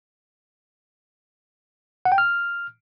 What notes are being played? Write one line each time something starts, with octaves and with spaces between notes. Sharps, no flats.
F#5
G5
F6